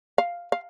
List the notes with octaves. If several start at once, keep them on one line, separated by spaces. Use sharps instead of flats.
F5
F5